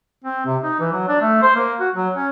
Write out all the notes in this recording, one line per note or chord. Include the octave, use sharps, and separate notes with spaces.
C4
C3
D#4
E3
F#3
D4
A3
C5
A#3
F#4
F#3
C#4